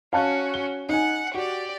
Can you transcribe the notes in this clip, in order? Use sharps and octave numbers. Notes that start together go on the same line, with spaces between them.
C#4 F#4 F5 A5 F#6
G7
D#4 F#5 G#5
F#4 G4 D5